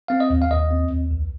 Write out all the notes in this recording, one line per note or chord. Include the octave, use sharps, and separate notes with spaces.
C4 F5
D#5
D#2
F5
D#2 D#5
C4
D#2
C2